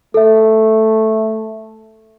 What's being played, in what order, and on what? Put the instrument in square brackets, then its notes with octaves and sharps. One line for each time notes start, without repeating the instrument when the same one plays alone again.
[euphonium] A3 [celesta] A4 E5